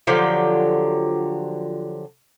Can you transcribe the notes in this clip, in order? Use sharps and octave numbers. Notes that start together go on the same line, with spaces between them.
D3 F3 F#3 G4